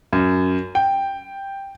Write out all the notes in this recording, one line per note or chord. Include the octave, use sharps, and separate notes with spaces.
F#2
G5